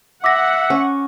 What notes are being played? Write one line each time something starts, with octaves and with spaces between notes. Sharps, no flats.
E5 F#5 D6 A#6
C#4